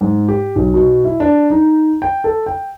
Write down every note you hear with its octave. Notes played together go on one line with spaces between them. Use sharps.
G#2
G4
B1
B2
E4
D4
D#4
G5
A4
G5